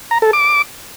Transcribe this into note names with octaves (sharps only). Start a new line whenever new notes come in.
A#5
A4
D6